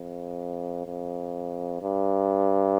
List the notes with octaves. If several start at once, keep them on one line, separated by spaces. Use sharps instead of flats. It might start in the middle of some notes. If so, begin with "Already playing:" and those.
Already playing: F2
F2
G2